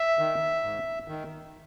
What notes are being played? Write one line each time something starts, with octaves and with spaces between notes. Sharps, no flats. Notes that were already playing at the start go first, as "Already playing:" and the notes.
Already playing: E5
D#3
G#2
D#3